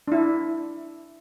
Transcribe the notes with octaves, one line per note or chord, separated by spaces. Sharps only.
D4 E4